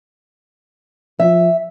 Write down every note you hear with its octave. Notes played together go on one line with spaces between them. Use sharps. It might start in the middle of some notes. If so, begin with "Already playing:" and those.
F3 E5